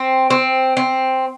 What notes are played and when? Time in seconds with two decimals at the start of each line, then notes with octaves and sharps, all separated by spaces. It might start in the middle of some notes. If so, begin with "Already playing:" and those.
Already playing: C4
0.30 C4
0.77 C4